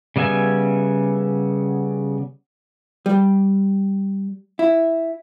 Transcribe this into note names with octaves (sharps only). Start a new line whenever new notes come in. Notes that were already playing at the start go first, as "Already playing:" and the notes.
C#3 G3 B3 E5 G#5
G3
E4